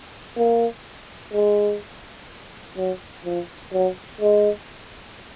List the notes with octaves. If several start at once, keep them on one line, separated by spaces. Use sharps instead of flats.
A#3
G#3
F#3
F3
F#3
G#3